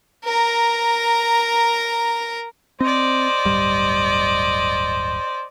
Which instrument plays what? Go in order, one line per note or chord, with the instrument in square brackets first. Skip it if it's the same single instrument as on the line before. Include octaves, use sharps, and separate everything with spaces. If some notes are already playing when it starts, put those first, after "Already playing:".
[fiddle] A#4 A#5
[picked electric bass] C4 [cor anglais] C5 [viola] D5 D#5
[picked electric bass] D1 G1 G3